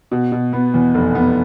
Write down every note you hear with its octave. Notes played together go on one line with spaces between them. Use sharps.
B2
B2
B3
E2
F1
B3